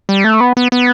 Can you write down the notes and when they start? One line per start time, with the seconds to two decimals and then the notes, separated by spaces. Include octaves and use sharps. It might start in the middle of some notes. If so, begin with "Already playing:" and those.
0.09 G3
0.24 A3
0.40 B3
0.57 B3
0.72 B3